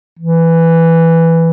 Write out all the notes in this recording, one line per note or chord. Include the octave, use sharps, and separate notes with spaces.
E3